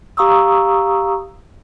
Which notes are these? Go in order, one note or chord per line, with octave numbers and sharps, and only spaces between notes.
G4 F5 A#5 C#6 D#6 E6